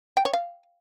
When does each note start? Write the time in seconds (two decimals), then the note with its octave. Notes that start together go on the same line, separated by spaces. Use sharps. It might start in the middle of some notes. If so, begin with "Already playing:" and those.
0.17 G5
0.25 C#5
0.33 F5